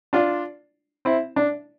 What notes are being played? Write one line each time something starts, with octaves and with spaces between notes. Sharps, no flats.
D4 F4
C4 E4
D4